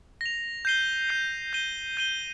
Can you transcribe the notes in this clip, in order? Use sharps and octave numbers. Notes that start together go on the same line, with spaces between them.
A#6 F7
G6 C7 D#7 G7
G6 C7 D#7 G7
G6 D#7 G7
G6 D#7 G7